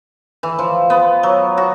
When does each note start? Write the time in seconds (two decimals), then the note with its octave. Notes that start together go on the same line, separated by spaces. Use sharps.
0.43 E3
0.59 F3
0.90 B3
1.23 F#3
1.57 F#4